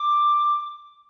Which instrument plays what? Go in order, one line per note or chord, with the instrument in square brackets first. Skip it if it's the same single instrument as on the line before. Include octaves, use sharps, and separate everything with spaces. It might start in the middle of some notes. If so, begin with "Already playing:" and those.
Already playing: [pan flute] D6